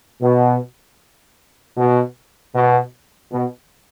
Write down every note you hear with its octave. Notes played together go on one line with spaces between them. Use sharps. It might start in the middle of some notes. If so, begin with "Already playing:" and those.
B2
B2
B2
B2